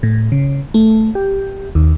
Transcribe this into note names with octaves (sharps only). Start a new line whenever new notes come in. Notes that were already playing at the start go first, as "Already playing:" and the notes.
A2
C#3
A3
G4
D#2